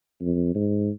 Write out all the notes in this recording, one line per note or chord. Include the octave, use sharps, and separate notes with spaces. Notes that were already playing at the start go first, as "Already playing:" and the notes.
F2
G#2